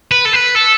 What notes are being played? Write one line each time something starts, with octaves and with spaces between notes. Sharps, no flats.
B4
A4
B4
A4